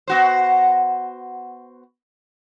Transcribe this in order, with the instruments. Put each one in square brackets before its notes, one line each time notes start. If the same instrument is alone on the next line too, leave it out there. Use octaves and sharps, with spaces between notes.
[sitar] B3 F#4 C5